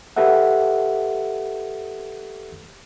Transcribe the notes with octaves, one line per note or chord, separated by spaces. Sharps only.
G4 A4 B4 E5 F#5